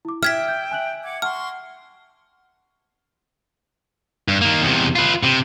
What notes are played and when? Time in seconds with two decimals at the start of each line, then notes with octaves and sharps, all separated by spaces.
0.05 E4 D6
0.23 E5 G5 F6 G#6 B6
0.48 G6
0.71 G#5 F#6 F#7
1.03 F#5 D6 G#6
1.22 F#5 A5 C6 C#6 F6
4.28 G2
4.41 D#3 A#3
4.61 E2 C3
4.96 F4 B4
5.23 C3